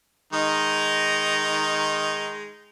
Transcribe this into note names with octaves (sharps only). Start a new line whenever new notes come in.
D#3 G#3 D#4